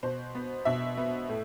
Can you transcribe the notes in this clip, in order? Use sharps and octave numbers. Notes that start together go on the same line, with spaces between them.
B2 C5
B3
B2 E5
B3
A2